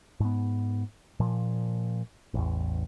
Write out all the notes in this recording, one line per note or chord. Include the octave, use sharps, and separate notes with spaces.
G#2 B3
A#2 F3
A1 E2